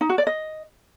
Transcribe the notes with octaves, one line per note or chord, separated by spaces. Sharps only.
D#4
F#4
D5
D#5